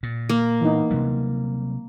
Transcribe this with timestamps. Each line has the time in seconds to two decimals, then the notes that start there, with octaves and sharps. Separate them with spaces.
0.03 A#2
0.29 A#3
0.61 E3 B3 D#4
0.90 C3 F#3 G3